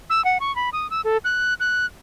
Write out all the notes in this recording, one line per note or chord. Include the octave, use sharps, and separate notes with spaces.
E6
F#5
C#6
B5
D#6
E6
A4
F#6
F#6